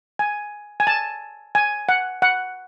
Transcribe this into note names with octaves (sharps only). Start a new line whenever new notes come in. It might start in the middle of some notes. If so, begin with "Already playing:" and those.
G#5
G#5
A5
G#5
F#5
F#5